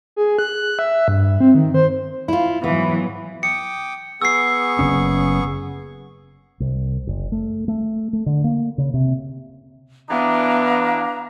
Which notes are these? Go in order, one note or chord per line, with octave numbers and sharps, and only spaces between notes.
G#4
F#6
E5
G2
C4
D#3
C5
E4 F4
G#2 E3 F#3 B3
G5 D6 D#6 C#7
B3 G#4 C#6 E6 C7
F#1 C#4
C2
F#1
A3
A3
A3
D3
A#3
C#3
C3
E3 B3 D4 F5 A#5